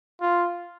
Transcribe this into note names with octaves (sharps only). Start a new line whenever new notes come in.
F4